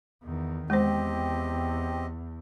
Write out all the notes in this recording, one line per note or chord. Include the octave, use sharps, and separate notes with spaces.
E2 D#3
E2 G#3 C4 G4 C5 D#5